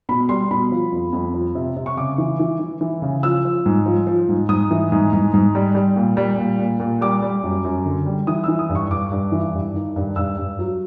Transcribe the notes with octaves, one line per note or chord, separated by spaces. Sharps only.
B2 B5
G3 C6
B2 B5
F3
F2
F2
F3
C3
C3
C#6
C#3 D6
E3
E3
E3
E3
C#3
F3 E6
F3
G#2
F3
F3
G#2
G#2 D#6
E3
G#2
G#2
G#2
G3
G3
A#2
G3
A#2
A#2
A#2
G3 D6
G3
F#2
F#2
D3
G3
E3 D#6
E3 E6
D#6
G2
C#6
G2 D6
G2
E3
G2
D#3
G2
G2 E6
G2
F#3